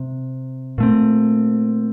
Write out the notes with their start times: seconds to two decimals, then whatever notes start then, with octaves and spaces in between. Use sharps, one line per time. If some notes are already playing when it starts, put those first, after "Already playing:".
Already playing: C3
0.78 A#2 A3 C4